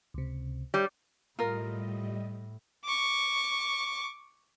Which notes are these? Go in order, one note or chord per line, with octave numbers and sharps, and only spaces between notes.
C#2 C3
G3 C#5 D5
A2 G3 F4 A#4 D#5
C#6 D6